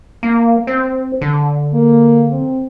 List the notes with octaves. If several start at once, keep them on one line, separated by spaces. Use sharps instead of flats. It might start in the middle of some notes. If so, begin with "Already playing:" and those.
A#3
C4
D3
A#3
C4